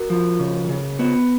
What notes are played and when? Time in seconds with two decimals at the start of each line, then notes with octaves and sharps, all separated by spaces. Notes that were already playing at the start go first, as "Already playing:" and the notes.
Already playing: F#4 A#4
0.10 F3
0.39 C#3
0.69 C#3
0.99 B3